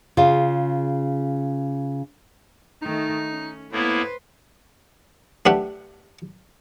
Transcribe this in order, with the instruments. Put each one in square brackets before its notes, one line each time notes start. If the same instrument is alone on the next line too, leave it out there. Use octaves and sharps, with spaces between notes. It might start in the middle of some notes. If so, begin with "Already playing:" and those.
[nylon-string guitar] C#3 F4
[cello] D#3 A3 [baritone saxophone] D#4
[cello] C#4
[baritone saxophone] A2 [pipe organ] A#3 B3 E4 [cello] B4 C5
[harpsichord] A3 D4 G4 B4 E5 F#5